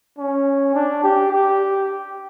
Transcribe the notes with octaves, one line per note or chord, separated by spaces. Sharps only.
C#4
D4
G4
G4